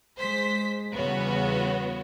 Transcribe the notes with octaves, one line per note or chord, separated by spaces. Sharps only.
G#3 C5 B6
E2 C#3 G3 B3 F#4 C#5